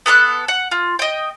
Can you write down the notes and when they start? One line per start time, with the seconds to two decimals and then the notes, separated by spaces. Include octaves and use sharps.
0.06 B3 A4 C#6 F#6
0.48 F#5
0.71 F4
0.99 D#5 G5